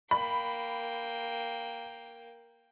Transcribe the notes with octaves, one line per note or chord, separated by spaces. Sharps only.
A#3 G5 B5